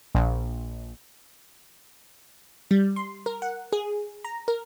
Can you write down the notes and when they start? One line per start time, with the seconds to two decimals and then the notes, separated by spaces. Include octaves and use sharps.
0.15 A#1
2.71 G3
2.96 C6
3.26 A#4
3.42 F#5
3.73 G#4
4.25 A#5
4.48 A#4